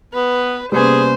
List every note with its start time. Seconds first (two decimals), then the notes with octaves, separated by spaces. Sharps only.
0.14 B3 B4
0.72 C3 G3 A#3 B3 C#4 G#4 C5 G#5